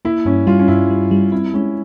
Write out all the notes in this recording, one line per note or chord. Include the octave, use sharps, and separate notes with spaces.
A#3 E4
G2 C#4
G3 F4
C#4
G2 E4
G3
G3
C4 E4
G#3 C#4